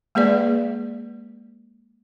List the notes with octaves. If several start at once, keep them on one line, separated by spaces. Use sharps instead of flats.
G#3 A#3 G#4 B4 D5